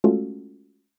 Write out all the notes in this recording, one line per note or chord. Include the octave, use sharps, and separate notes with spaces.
G#3 A3 C#4 F4 F#4 A4